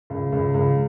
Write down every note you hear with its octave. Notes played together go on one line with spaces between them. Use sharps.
C#2
C#2
C#2